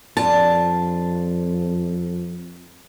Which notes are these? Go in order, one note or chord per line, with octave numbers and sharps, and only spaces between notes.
F2 D4 F4 A5